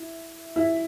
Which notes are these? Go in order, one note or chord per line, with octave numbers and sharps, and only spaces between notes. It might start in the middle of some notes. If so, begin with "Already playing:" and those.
Already playing: E4
E4